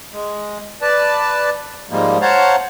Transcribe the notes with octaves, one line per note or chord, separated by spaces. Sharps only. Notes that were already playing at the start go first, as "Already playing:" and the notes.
G#3
B4 D5 A5
G#2 F3 G3 G#3 A#3
C5 C#5 F5 F#5 A5 A#5